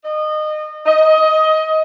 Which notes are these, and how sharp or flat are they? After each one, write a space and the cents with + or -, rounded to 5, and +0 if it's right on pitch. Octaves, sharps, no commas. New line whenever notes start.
D#5 -25
D#5 +20